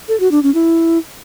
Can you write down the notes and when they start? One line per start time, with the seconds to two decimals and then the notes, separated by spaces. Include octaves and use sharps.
0.08 A4
0.20 F#4
0.31 D4
0.43 C#4
0.54 E4